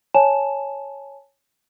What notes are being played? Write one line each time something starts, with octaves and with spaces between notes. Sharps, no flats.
C#5 G#5 A5 E7